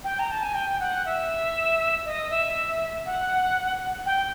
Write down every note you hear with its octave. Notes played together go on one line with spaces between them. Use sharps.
G5
A#5
A5
G#5
G5
F#5
E5
D#5
E5
F#5
G5